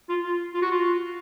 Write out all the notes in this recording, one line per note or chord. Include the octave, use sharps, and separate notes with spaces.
F4
F4
F4
F#4
F4